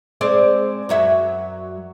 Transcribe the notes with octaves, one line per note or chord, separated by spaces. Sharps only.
G#3 C4 D5
F#2 F#3 E5